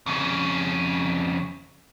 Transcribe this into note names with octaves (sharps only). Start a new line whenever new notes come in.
F2 C#3